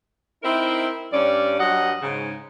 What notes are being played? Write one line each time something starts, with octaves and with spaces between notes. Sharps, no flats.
C4 D#4 E4 A#4 C5 E5
G2 C#4 D5
G2 F#3 D#5 F#5
G#2 C#3